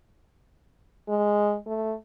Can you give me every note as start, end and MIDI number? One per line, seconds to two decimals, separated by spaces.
1.09 1.56 56
1.67 1.95 57